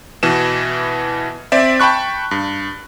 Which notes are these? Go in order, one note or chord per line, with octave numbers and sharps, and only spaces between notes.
B2 E3 E7
C4 D5 E5
G5 A5 B5 C#6 F#6
G2